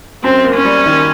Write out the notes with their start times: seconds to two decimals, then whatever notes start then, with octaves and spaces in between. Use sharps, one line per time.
0.24 F#2 C4
0.44 A#3
0.54 C#4
0.65 G3
0.86 D#3